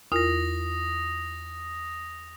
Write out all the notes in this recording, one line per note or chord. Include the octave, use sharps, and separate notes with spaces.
E2 F4 A#4 D#6 A#6